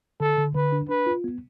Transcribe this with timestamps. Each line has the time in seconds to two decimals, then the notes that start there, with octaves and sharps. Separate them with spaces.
0.20 D3 A4
0.38 D3
0.55 D3 B4
0.72 D4
0.89 D4 B4
1.06 F4
1.24 B3